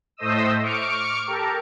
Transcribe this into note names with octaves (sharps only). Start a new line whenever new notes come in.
A2 A3 C5 D#5 D#6 E6
C#6 D6 F6 C#7 D7
G4 A4 A#4